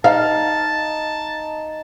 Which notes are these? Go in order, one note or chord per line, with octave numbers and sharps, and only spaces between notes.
D#4 F5 A5